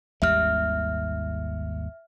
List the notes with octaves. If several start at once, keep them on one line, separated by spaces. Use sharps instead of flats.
G#1 D#2 G3 E5 F6